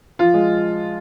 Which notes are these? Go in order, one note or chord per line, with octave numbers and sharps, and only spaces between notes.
F3 F4
G#3